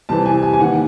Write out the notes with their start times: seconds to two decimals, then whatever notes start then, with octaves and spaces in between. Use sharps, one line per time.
0.09 C2 C3 E3 A5
0.26 G#5
0.43 G#5
0.53 G#5
0.59 D#2 D#3 F#5